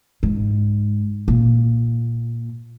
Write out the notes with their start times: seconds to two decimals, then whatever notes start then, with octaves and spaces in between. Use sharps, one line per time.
0.23 G#2
1.28 A#2